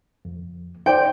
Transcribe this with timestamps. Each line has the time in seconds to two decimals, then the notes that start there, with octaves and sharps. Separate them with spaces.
0.25 F2
0.86 D#4 C5 D5 G5